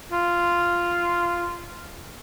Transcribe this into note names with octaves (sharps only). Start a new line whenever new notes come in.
F4